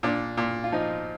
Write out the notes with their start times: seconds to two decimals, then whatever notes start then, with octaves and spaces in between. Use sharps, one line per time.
0.03 A#2 D4
0.37 A#2
0.64 F4
0.72 F3 D#4